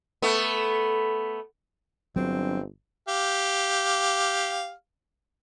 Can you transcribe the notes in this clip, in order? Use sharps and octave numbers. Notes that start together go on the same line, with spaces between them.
A3 B3
G1 F#3 C4 D4
G4 F5